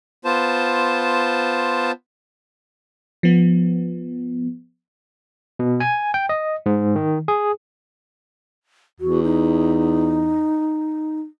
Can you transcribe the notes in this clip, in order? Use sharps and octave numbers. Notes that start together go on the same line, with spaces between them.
B3 F4 C5 A5
F3 B3
B2
G#5
G5
D#5
G#2
D#3
G#4
E2 F#4
D#4